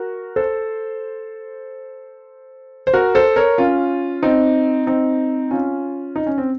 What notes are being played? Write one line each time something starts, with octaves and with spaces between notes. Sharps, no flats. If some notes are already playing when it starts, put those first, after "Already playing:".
Already playing: F#4 A#4
A4 C5
C5
F#4 A#4
A4 C5
A#4 C#5
C#4 F4
C4 D#4
C4 D#4
C#4 F4
D#4
C#4
C4